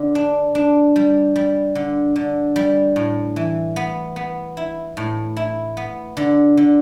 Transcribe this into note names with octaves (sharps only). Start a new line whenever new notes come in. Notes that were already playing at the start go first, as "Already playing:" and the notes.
Already playing: D3
D4
D4
G3
G3
D3
D3
G3
A2
E3
B3
B3
E4
A2
E4
B3
D3
D3